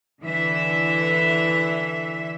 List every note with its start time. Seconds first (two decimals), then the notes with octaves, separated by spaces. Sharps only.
0.22 D3 E3 E5